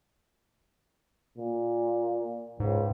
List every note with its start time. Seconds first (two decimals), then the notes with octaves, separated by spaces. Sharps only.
1.38 A#2
2.60 C#2 G#2